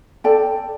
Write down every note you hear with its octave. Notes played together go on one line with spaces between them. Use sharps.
A4 D5 G5